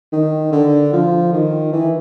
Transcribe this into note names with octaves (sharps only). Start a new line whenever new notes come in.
D#3
D3
F3
D#3
E3